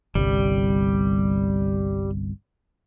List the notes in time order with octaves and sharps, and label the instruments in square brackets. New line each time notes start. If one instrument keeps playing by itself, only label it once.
[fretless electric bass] G1 C2 [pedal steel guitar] G3